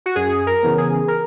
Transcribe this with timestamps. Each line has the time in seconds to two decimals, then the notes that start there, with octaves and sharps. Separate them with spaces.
0.06 F#4
0.15 F#2 G#4
0.47 A#4
0.63 C#3 E3 B3
0.78 G#4
1.08 A#4